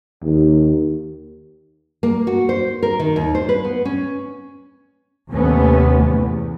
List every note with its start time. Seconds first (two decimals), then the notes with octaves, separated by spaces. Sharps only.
0.24 D#2
2.03 A#3
2.27 F#4
2.49 C5
2.83 A#4
2.99 D#3
3.16 D#2
3.35 C5
3.49 B4
3.64 B3
3.85 C#4
5.31 D#2 C3 A3 B3 C#4
6.08 E2